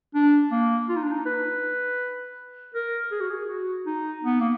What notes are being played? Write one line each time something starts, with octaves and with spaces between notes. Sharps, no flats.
D4
A#3
F4
D#4
D4
D#4
B4
A#4
G#4
F#4
G#4
F#4
D#4
B3
A#3